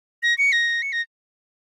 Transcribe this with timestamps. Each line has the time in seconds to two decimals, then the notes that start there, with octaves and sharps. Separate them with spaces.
0.23 A#6
0.38 C#7
0.52 A#6
0.82 C#7
0.92 A#6